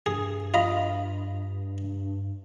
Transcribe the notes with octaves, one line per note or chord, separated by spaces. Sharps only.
G2 G#4
F4 D#5 B5